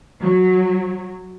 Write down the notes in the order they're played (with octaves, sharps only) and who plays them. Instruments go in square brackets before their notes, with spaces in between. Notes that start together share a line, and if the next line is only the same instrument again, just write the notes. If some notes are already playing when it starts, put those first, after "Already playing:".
[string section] F#3